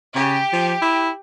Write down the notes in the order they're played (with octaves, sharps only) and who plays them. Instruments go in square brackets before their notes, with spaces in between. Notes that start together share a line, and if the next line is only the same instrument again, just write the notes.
[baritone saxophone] C#3 [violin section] G4
[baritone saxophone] F3
E4